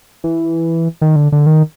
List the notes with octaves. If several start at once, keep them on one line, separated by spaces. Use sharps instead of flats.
E3
D#3
D3
D3
D#3